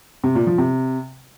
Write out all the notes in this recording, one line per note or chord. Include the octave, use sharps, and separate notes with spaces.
C3
A#2
F3
C3